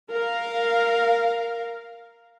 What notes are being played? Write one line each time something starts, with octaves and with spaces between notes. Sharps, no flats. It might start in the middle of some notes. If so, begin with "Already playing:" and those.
A#4 F5